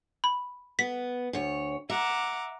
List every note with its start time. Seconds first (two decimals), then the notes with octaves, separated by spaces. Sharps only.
0.24 B5
0.79 B3 B6
1.33 D2 C#5
1.90 E5 F#5 A#5 D6